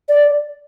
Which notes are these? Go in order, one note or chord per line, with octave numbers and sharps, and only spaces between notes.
D5